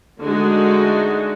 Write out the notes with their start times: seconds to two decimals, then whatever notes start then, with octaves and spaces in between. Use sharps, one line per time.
0.22 D3 G#3 A3 D#4 F#4